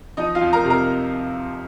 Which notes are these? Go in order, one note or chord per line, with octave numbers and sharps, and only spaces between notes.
F3 D#4 D#5
F4 F5
F2
A#4 A#5
C3
A#4 A#5